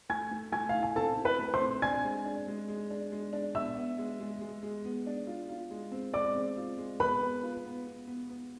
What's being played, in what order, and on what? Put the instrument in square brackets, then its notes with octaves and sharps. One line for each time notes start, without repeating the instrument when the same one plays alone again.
[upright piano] A3 [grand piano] G#5 G#6
[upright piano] A3
[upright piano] A3 [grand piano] G#5 G#6
[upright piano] E4 [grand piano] F5
[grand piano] G#5
[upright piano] C4 [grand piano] A4 A5
[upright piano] E4
[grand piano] B4 B5
[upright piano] A3
[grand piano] C5 C6
[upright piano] C4
[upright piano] D4 [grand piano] G#5 G#6
[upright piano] G#3
D4
G#3
G#3
D4
G#3
D4
[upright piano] B3 [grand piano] E5 E6
[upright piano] B3
G#3
G#3
G#3
G#3
B3
D4
F4
F4
G#3
C4
[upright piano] G#3 [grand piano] D5 D6
[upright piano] C4
F4
G#3
[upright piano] B3 [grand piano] B4 B5
[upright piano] B3
F4
B3
B3
B3
B3